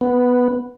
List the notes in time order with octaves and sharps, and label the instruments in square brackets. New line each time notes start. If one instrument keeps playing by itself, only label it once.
[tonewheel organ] B3